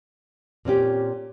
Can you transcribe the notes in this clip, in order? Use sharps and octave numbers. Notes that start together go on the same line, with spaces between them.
A#2 C4 C#4 G4